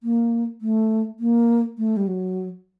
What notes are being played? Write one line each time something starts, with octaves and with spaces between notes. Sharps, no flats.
A#3
A3
A#3
A3
G3
F#3